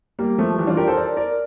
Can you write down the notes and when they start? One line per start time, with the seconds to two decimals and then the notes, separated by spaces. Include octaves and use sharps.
0.19 G3 A#3
0.38 F3 A3
0.58 E3 G3
0.67 D4 F4
0.77 G4 A#4
0.87 A4 C5
0.97 A#4 D5
1.17 A#4 D5